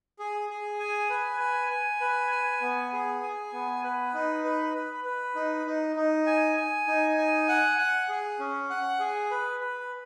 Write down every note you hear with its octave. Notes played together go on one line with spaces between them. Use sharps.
G#4
G#4
G#5
B4
G#5
G#5
B4
G#5
B3
G#4
G#5
B3
B4
D#4
B4
B4
B4
D#4
D#4
D#4
G#5
G#5
D#4
G#5
F#5
F#5
G#4
C#4
F#5
G#4
B4
B4